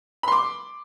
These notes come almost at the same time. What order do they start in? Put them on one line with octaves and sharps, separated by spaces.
B5 C6 D6